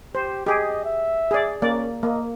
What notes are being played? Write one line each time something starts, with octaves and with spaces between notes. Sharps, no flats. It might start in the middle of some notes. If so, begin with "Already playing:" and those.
G4 C5
G4 G#4 D#5
E5
G#4 D5
A#3 C#4 D5
A#3 D#5